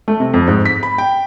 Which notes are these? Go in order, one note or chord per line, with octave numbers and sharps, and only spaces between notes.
A3
C3
F2
G#2
B6
B5
G5